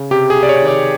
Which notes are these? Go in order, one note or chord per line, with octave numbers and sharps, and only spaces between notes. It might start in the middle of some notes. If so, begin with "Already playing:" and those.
Already playing: C#3
C3 G4
G#4
C3
D5
C#5
D#3
D5